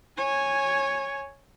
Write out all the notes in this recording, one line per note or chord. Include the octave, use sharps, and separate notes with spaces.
C#5 G#5